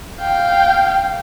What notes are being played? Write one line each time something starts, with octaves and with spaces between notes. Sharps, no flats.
F5 G5